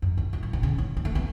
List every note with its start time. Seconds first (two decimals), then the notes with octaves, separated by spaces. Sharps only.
0.02 F#2
0.17 E2
0.33 F#2
0.43 A2
0.53 B2
0.63 C#3
0.78 E3
0.97 G#3
1.05 A3
1.15 B3